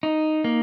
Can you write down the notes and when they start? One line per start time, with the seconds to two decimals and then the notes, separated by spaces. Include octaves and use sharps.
0.03 D#4
0.44 A#3